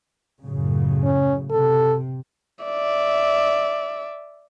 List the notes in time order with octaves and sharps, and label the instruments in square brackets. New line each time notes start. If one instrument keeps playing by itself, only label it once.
[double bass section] F#2 A2 C#3
[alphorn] C#4
[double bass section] C3 [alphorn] A4
[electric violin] D5 E5